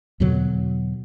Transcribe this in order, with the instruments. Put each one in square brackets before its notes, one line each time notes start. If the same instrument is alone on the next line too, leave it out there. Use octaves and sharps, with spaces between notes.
[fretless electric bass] E2 B2 D3 F#3